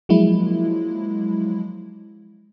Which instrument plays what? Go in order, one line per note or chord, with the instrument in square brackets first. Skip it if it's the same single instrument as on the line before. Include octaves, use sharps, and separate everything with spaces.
[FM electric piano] F3 F#3 G#3 A#3 E4